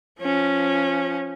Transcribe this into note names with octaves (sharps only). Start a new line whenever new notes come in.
F3 C#4